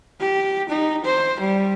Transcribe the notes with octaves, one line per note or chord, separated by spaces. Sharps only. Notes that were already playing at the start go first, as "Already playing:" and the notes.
G4
D#4
C5
G3